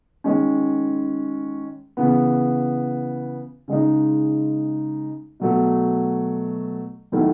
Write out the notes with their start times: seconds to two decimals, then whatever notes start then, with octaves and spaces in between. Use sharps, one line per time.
0.24 D#3 G#3 C#4
1.97 C#3 E3 B3
3.68 C#3 G#3 D#4
5.40 B2 F#3 A3
7.12 D#3 F#3 A3 E4